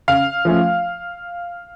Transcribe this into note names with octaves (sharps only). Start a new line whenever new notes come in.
C#3 F5
F3 A3 C#4